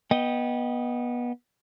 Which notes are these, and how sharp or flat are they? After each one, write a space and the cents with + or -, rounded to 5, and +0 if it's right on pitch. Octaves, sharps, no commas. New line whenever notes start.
B3 -25 D#5 +0 G5 +0